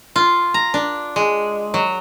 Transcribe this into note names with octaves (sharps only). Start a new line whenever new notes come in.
F4
A#5
D4
G#3
F#3